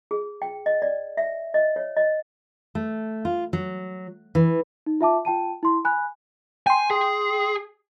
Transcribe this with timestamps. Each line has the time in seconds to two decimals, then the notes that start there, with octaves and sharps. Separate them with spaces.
0.11 G#4
0.42 G5
0.66 D#5
0.82 D5
1.17 E5
1.54 D#5
1.76 C#5
1.97 D#5
2.75 A3
3.25 F4
3.53 F#3
4.35 E3
4.86 D#4
5.01 F4 E5 A5 D6
5.25 F4 G5 A5 D#7
5.63 E4 C6
5.85 G#5 B5 F#6
6.67 G5 G#5 C6
6.91 G#4